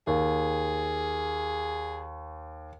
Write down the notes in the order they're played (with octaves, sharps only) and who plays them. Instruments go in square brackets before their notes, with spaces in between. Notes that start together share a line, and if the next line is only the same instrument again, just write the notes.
[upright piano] D#2 [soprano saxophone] G#4